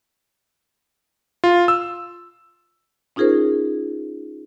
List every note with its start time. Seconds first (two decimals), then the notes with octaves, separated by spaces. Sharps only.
1.44 F4
1.68 E6
3.16 C#4 D#4 F4 G#4 A#4 C5